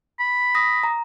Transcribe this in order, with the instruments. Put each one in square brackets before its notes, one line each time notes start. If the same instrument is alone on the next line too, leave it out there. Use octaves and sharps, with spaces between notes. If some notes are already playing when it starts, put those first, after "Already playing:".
[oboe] B5
[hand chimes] D#6 A#6
A#5